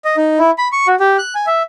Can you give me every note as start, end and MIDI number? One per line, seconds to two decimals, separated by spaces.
0.05 0.16 75
0.17 0.39 63
0.39 0.51 64
0.58 0.68 83
0.72 0.87 85
0.87 0.95 66
1.00 1.17 67
1.19 1.34 90
1.35 1.46 80
1.47 1.62 76